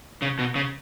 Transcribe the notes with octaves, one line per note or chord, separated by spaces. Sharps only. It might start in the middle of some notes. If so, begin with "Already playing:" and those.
C#3
B2
C#3